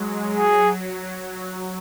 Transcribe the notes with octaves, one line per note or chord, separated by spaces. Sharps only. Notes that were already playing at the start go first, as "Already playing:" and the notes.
Already playing: F#3 G#3
F#3 G#4